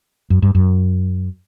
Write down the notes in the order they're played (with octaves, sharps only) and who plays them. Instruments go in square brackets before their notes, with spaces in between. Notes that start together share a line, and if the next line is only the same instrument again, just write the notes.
[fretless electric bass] F#2
G2
F#2